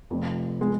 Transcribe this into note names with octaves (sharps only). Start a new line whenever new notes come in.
F1 F2 F3
G#3